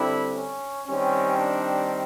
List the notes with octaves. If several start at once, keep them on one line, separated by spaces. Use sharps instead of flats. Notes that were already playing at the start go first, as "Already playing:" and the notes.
Already playing: D3 G3 C4 E4
C#4
D#3 G3 C4 C#4
D4